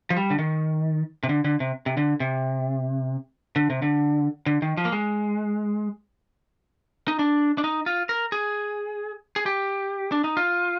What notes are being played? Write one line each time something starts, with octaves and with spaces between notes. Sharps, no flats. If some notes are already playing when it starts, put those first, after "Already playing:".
F3
G3
D3
D#3
C3
D3
D3
C3
C3
D3
C3
D3
C3
D3
D3
D#3
F3
A#3
G#3
D#4
D4
D4
D#4
F4
A#4
G#4
G#4
G4
D4
D#4
F4